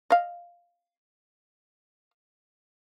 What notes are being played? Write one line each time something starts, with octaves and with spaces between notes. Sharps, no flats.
D#5 F5